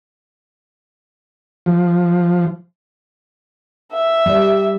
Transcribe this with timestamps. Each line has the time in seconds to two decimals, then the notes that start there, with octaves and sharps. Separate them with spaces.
1.66 F3
3.93 E5
4.26 G3 D5